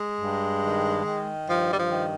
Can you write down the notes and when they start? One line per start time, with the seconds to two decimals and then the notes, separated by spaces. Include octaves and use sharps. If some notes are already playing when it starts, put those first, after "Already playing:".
Already playing: G#3
0.21 G2
0.63 D#3
1.05 D#3
1.48 G2 F3
1.71 G3
1.77 F3
1.90 D#3